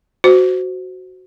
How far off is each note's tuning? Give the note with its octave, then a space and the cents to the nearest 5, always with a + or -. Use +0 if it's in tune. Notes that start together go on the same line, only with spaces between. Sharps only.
F#4 +0 C5 -20